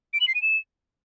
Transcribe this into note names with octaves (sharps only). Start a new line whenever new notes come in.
D7
F#7
C7
D#7
E7